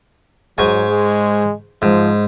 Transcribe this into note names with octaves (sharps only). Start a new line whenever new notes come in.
G#2 F#3 G#5 C#6
G#3
G#2 F3